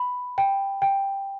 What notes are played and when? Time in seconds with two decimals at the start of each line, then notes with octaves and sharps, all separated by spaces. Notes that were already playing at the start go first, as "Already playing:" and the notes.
Already playing: B5
0.38 G5
0.82 G5